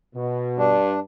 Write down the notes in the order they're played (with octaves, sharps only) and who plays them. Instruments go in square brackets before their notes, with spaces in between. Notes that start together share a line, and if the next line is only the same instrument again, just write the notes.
[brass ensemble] B2
[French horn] G2 [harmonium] D4